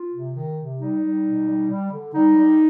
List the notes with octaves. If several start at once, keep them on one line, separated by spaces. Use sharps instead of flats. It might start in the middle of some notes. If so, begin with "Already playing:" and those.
Already playing: F4
C3
D#3
C3
G3 D#4
G3
B2
G3
G3
D3
G3 D#4
G3